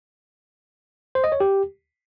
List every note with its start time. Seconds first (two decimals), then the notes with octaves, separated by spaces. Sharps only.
1.15 C5
1.24 D#5
1.32 C#5
1.40 G4